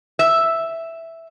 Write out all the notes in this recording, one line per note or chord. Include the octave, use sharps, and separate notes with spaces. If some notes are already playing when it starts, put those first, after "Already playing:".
E5